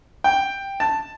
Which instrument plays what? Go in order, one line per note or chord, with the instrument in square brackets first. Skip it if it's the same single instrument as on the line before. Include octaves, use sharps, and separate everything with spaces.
[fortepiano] G5
A5